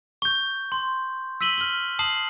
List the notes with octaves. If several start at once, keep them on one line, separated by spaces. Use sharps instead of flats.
C#6 G6
C6
E6 B6 D#7 F#7 G7
F6 G7
A5 D#6 C7 F#7